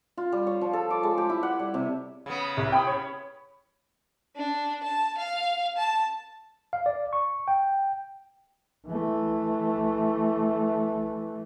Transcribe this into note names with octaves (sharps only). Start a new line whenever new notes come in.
F4
G3
C#5
F3
A4
D6
G#3
G4
E4
F#5
G3
C3
C#3 B3
C2
G5 B5 D#6
C#5 B5
D4
A5
F5
A5
F5
D5
C#6
G5
E3 A3